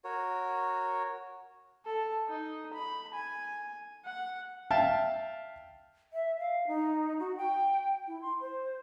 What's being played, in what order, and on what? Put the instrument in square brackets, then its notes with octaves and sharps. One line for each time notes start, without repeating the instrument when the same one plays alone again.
[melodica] F#4 A#4 C#5
[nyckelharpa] A4
D#4
B5
G#5
F#5
[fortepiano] E5 F5 G5 A5
[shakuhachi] E5
F5
D#4
F#4
G5
E4
C6
C5